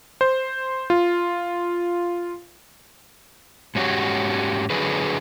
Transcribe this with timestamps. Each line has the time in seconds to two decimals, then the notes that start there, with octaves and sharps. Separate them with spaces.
0.21 C5
0.90 F4
3.75 G#2 C#4 F#4 G4 C#5
4.70 D3 F#3 G#4 B4